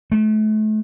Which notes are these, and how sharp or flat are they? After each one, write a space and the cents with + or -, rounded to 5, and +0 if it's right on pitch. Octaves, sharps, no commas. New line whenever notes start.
A3 -35